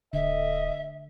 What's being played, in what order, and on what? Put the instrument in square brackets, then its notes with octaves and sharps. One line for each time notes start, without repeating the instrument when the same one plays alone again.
[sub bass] D1 [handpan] D3 [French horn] D#5 [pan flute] E5